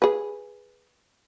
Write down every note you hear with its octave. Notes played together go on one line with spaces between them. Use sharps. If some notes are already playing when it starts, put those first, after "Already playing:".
G#4 B4